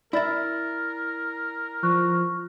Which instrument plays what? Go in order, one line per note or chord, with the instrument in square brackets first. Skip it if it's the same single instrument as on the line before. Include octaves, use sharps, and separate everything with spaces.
[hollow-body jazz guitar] E4 E5 [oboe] A#4 [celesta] D5 A6
[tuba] F3 [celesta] C#6 F6 F#6